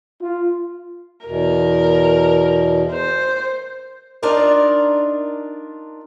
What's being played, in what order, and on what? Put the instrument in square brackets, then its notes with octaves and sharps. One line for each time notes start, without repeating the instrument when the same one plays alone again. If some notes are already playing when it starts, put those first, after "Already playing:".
[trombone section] F4
[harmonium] E2 B2 [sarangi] A#4
[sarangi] C5
[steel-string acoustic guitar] D4 D#4 F4 A#4 D5